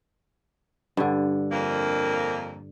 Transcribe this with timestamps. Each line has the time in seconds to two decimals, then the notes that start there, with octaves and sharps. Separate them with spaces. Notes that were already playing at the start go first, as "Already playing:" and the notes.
0.97 G2 D3
1.51 F2 A#2 A#3